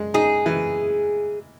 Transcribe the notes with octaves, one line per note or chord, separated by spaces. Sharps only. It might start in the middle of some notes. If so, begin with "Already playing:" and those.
Already playing: G#3
D#4 G#4
E3